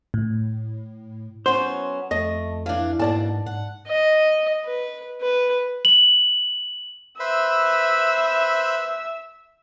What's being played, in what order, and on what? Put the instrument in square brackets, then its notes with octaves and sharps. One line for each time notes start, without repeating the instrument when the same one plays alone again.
[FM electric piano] A2
[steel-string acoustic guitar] F#3 B3 C#4 [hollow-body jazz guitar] C5
[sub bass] F2 [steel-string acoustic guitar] A3 [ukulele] D#5
[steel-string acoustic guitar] E3 D4 [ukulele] F5
[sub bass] G#2 [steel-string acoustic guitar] B2 A#3 D4 [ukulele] D5 A5
[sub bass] G#2 [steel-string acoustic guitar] F#5
[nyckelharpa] D#5
B4
B4
[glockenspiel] F#7
[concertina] B4 C5 B5 [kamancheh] E5 E6